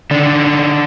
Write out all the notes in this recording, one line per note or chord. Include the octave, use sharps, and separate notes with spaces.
D3 D#3 D4
D#3
D#3